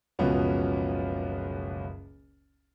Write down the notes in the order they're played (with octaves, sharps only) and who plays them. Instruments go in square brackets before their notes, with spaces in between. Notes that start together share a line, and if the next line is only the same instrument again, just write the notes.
[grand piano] F#1 C#2 B2 F3 B3 C#4